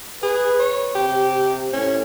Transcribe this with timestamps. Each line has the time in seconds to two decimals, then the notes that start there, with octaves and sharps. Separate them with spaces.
0.23 G#4 B4
0.59 C#5
0.95 C3 G4
1.73 A2 C#4